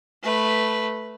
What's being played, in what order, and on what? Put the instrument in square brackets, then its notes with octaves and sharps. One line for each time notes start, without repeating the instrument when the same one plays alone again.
[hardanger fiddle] A3 B4